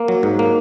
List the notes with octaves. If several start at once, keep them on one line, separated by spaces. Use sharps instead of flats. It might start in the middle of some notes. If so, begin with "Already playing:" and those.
Already playing: A#3
F#3
G#2
A#3